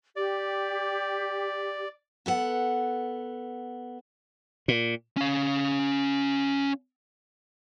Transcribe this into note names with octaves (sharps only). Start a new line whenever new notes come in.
G4 D5
B3 A4 F#5
A#2
C#4 F5